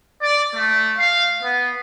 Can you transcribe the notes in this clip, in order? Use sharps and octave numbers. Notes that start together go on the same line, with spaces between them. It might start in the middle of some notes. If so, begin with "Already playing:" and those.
D5
A3
F5
B3